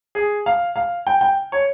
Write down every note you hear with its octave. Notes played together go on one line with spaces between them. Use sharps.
G#4
F5
F5
G5
G5
C#5